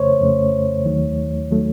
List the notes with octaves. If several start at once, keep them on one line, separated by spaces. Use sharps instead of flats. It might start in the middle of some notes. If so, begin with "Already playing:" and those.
Already playing: F2 C#3 A3 C5 C#5
F2 C#3 A3
D#2 D#3 F#3 A3
D#3 F#3 A3